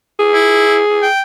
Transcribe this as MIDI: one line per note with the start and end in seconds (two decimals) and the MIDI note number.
0.19 1.07 68
0.33 0.78 64
1.02 1.23 79